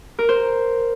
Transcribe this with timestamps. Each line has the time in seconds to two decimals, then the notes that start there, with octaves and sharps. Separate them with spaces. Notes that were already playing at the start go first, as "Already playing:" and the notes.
0.19 A#4
0.29 C5